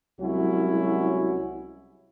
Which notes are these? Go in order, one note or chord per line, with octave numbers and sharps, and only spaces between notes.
C2 F#3 G#3 C#4 E4 F#4